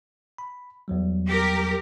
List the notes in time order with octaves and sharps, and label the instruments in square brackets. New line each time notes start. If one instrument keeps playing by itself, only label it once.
[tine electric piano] B5
E2 F#3 G3
[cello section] G4 A#4